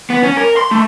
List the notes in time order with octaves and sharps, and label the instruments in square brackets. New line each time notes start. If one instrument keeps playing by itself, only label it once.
[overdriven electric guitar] B3
C#4
A#4
C6
A3